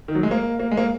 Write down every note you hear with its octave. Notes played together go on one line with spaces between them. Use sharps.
D#3
F#3
G#3
A#3
A#3
G#3
A#3